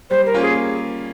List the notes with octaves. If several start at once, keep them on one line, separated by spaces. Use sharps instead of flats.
G3 C5
A#4
A#3 C#4 F4
G#4